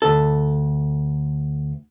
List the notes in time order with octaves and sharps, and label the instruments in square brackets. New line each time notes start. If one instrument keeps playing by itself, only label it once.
[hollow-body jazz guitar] D2 A4